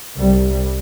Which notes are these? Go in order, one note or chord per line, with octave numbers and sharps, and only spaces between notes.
C2 G3